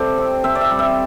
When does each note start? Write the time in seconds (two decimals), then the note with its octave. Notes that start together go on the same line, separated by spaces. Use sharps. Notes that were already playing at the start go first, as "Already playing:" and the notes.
Already playing: C3 G3 G4 A4 C5 D5
0.18 C4
0.44 C4 E5
0.55 D5
0.61 E5
0.71 G3
0.79 E5